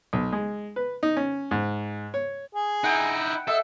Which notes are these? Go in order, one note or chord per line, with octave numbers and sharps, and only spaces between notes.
B1
G#3
B4
D#4
C#4
G#2
C#5
G#4
D#4 E4 F#5 G5
A4 D#5 E5